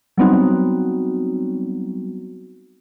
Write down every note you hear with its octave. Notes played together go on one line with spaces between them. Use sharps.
F#3 G3 B3 C4 D#4 F#4